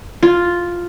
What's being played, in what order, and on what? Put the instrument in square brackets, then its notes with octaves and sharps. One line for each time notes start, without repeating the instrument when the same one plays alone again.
[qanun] F4